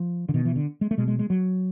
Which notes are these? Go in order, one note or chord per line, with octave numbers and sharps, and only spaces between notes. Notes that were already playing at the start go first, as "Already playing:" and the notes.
Already playing: F3
D3
B2 D#3
E3
D3
G#3
A3
B2 G#3
G#3
G#3
F#3